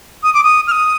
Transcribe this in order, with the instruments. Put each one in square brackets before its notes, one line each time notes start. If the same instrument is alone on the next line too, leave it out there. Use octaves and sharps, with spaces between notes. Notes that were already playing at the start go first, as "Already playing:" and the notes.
[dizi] D#6
D6
D#6
F6
D#6